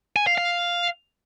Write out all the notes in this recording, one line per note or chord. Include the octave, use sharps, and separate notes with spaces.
G#5
F5
F5